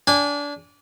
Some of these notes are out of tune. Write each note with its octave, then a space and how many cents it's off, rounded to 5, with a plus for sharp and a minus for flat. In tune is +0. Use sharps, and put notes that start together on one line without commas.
D4 -25 G#5 -20